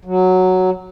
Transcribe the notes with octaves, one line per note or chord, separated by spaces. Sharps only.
F#3